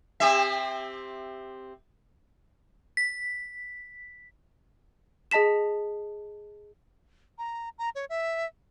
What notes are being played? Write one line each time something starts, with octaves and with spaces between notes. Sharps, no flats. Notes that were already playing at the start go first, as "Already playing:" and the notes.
C4 G4 E5
B6
G#4 D#5 A5 B6 E7
A#5
A#5
C#5
E5